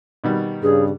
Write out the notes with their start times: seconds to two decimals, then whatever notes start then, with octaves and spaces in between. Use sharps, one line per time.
0.24 B2 D#3 G3
0.63 G2 C#3 G#4